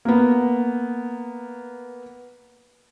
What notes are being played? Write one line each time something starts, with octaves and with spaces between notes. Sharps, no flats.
A#3 B3